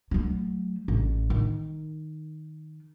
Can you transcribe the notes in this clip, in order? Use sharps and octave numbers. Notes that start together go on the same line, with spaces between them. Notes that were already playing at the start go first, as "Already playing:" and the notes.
F#3 A3
A1
D#3